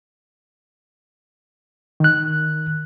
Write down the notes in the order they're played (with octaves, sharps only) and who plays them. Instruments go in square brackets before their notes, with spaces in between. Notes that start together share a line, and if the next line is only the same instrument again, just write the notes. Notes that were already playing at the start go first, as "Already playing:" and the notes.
[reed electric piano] D#3 F#6